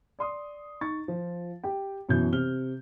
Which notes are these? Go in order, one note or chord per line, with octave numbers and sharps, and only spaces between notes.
D5 C6 D#6
D#4 C#6 A6
F3 F4
G4 G5
F#2 B2 E3 E4 G6
C3 F6 G7